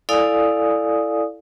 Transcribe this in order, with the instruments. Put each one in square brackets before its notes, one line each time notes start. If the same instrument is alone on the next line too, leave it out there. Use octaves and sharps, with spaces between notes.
[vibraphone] E4 A4 D5 F5 G#5 D#6